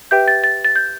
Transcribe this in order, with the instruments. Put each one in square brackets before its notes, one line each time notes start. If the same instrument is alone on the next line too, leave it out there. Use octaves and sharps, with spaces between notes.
[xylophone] G4 B4 E5 G5 G6
A6
A6
A6
G6